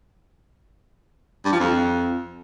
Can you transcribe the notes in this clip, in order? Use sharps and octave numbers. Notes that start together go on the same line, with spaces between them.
G2
F3
F2